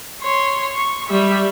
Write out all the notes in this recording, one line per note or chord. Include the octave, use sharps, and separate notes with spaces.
C#5 C6
C#6
G3 E5